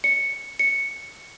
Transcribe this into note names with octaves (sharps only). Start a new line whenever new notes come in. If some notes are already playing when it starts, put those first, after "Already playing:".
C#7
C#7